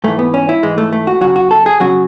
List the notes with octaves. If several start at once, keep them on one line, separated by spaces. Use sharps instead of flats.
G#2 E3 A3
B3
C#4
E4
G#2 E3 G#3
A3
A3
F#4
F#2 C#3 F#3 F#4
F#4
A4
G#4
C#3 F#3 F#4